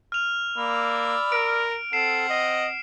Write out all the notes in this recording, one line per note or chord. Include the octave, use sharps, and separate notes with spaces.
F6 F7
A#3 D5 B5 E6
A#4 D7
C4 A4 F#5 C7 E7
D#5